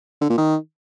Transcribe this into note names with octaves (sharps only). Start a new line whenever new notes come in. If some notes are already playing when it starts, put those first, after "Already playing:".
D3
A#2
D#3